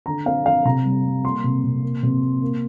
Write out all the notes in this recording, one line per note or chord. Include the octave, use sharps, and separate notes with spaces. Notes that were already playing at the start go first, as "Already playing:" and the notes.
D3 A#5
C4 F5
D3 F5
C3 A#5
G3
G3
A#3 C6
C3
C3
A#3
C3
A#3
A#3